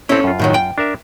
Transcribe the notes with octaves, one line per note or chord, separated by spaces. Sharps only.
C4 C#4 E4 A4
F#2 F4
A2 D#3 F#3
G5
D4 A#4 E5